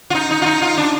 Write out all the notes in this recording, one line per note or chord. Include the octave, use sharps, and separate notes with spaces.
F4
D#4
D#4
F4
D#4
F4
D4